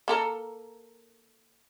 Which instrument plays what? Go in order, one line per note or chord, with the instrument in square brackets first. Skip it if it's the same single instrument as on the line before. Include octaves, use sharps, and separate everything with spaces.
[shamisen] A#3 A4 A#4